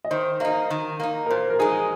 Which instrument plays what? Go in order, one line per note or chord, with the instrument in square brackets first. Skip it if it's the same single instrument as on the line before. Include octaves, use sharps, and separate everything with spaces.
[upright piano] D#5
[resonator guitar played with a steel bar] D#3 [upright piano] C5
[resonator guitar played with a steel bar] A#3 D#4 [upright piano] D#5
[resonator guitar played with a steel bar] D#3
A#3 D#4
[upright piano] A#4
[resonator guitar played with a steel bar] A#2 [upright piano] C5
[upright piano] A#4
[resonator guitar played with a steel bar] G#3 D#4 [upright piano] G#4